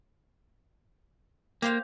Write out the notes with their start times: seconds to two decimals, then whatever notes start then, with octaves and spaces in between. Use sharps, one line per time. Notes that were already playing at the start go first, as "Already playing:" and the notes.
1.62 A#3 G4 C5 F5